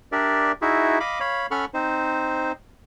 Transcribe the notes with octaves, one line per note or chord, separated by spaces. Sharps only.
D4 G4 A#4 D5 E5
D#4 E4 F#4 G#4 E5
D#5 F5 B5 D6
C#5 F5 B5
C#4 A4 F#5 B5 C#6 F6
C4 D#4 C5